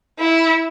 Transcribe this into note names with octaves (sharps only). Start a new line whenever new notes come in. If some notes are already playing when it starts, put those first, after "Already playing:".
E4